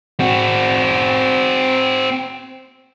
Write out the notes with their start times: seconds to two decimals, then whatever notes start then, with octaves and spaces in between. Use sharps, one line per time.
0.20 C4 F#4